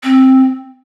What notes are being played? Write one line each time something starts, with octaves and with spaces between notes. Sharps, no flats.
C4